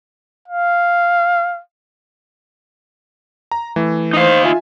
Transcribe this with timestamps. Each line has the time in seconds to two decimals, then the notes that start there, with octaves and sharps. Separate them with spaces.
0.48 F5
3.51 A#5
3.76 E3 A3
4.13 D#4 C5 F5
4.45 F4 E5 G#5